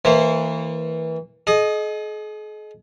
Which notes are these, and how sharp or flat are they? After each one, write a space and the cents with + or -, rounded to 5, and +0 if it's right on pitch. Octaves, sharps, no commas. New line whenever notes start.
E3 -25 A#3 -35 C5 +5
G#4 +45 D#5 -5